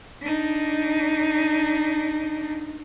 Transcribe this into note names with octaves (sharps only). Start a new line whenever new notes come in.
D4 D#4